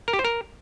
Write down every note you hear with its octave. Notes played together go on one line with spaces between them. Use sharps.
A#4
G4
C5
A#4